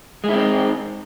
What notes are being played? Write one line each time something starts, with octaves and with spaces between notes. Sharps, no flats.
G#3 C4 D#4 E4